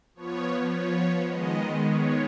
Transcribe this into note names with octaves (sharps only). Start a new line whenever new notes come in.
F3 B3 C#5
C#5
D#3 G#3 B3 D#5
C#5